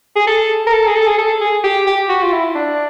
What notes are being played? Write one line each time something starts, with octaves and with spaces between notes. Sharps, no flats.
G#4
A4
A#4
A4
G#4
A4
G#4
A4
G#4
G4
G4
F#4
F4
E4
D4